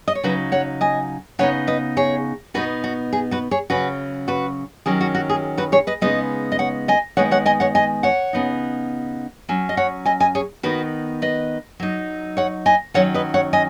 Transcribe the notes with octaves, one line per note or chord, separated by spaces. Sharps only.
D#5
C#5
C#3 F#3 D#4 F#4 B4
C#5 F#5
D#5 G#5
C#3 B3 D#4 C#5 F#5
B4 D#5
G#4 C#5
B2 B3 D#4 F#4 B4
F#4
G#4
F#4 B4
G#4 C#5
C#3 F#3 C#4 F#4 B4
F#4 B4
D#3 F#3 C#4 G#4
F#4
F#4
G#4
F#4 B4
G#4 C#5
B4 D#5
C#3 G#3 B3 D#4 B4 D#5
D#5
C#5 F#5
D#5 G#5
D#3 G#3 B3 C#5 F#5
C#5 F#5
D#5 G#5
C#5 F#5
D#5 G#5
C#5 F#5
C#3 B3 D#4
F#3 C#4
D#5
C#5 F#5
D#5 G#5
D#5 G#5
G#4 C#5
D#3 B3 D#4 F#4 B4
B4 D#5
F#3 D#4
C#5 F#5
D#5 G#5
D#3 F#3 C#4 C#5 F#5
B4 D#5
C#5 F#5
D#5 G#5